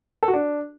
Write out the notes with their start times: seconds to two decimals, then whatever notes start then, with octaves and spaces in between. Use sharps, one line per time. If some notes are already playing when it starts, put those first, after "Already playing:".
0.23 A4
0.28 F#4
0.33 D4